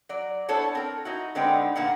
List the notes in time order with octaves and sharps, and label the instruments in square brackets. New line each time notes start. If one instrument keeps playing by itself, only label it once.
[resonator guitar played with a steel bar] F#3 D5
B3 D4 E4 A4 C5 C#5
C4 A#4
D#4 E4 F#4
D3 G#3 B3 C4 D#4 G5
A#2 D3 A#3 B3 F#5